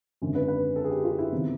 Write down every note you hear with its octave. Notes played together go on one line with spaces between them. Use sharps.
G#1 F#2 D3
B4
B4
A4
G#4
G4
F4
E4
G1 C3 D#3